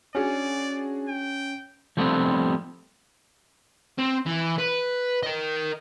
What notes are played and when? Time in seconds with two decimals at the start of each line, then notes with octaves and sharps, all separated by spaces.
0.15 C#4 D4 F#4 G#4 D5
1.08 G5
1.97 F3 G3 A3 B3 C4
3.99 C4
4.26 E3
4.58 B4
5.23 A#4 D#5